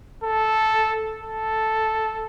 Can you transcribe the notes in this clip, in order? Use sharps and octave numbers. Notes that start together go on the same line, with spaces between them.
A4
A4